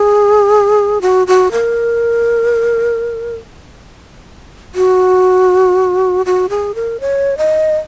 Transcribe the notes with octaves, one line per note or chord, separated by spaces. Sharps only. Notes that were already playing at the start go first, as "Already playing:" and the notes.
Already playing: G#4
F#4
F#4
A#4
F#4
F#4
G#4
A#4
C#5
D#5